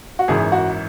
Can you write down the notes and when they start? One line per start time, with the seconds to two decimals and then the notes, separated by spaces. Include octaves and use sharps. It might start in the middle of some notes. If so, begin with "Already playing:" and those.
0.19 F#4
0.28 G#1 F#2 E3 G#4
0.52 F#4